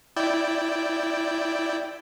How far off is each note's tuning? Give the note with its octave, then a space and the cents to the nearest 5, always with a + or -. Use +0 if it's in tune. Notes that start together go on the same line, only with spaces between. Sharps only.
E4 +0 D5 +0 G5 +0